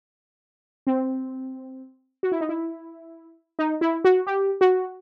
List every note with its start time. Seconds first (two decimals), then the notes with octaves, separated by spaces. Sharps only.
0.87 C4
2.23 F#4
2.32 E4
2.41 D#4
2.49 E4
3.59 D#4
3.81 E4
4.04 F#4
4.27 G4
4.61 F#4